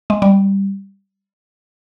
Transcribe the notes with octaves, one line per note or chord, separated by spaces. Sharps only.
G#3
G3